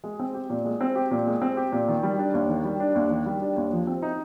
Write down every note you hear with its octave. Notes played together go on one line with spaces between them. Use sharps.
G#3
C4
G4
A#2
G#3
C4
G4
A#2
G#3
C4
G4
A#2
D#3
G3
D4
D#2
D#3
G3
D4
D#2
D#3
G3
D4
D#2
F3
C4
D#4